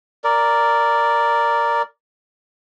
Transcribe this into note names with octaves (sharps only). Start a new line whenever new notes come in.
A#4 D5